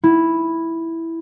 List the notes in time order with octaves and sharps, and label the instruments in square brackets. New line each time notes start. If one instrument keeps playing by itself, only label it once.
[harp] E4